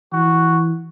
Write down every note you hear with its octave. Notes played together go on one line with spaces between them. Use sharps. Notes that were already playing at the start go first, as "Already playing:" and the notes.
E3 F#4